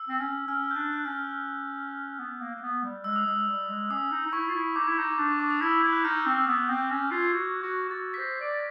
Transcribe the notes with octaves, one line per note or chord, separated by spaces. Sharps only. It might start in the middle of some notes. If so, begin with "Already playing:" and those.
Already playing: E6
C4
C#4
C#4 F6
G6
D4 F#6
F#6
C#4 F6
B3
A#3
A#3
B3
G3
G#3 E6
D#6
G#3 E6
G3
G#3
C#4 D#6
D#4
D#4
E4 C#6
F4
E4
D#4 D6
E4
D#4
D4
C#6
D6
D#6
E4 E6
E4 G6
F#6
D#4 F6
C4
F6
B3 F#6
C4 G6
C#4 G6
F4 G#6
G#6
F#4 G6
F#4 G#6
F#4 A6
B6
C5 A#6
D5